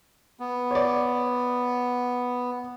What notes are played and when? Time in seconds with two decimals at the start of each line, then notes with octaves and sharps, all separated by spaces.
0.40 B3
0.71 C#5 D5